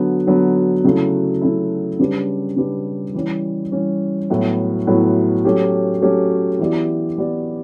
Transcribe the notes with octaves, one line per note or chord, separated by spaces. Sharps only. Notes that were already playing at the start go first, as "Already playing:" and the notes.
Already playing: D3 F#3 B3
D3 F#3 B3
C#3 F#3 A3 E4
C#3 F#3 A3 E4
C#3 G3 D4 G4 B4
C#3 G3 D4 G4 B4
E3 G3 C#4
E3 G3 C#4
A2 F#3 B3 E4
A2 F#3 B3 E4
F#3 A3 C#4 G4
F#3 A3 C#4 G4
E3 B3 E4 G4 D5
E3 B3 E4 G4 D5